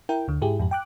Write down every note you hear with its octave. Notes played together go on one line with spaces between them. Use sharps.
E4 A#4 G5
D2 D3
G#2 E4 G4 G#4
F2 G#2 G4
G5 D6 F#6